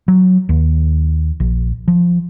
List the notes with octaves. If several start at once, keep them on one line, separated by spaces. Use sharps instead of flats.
F#3
D#2
A#1
F3